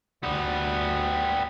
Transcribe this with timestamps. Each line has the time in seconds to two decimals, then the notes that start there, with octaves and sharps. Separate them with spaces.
0.23 D2 G3 B3